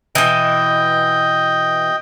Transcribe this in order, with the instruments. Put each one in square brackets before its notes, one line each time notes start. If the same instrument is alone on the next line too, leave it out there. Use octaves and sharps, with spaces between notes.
[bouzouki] B2 E3 [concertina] D#5 G5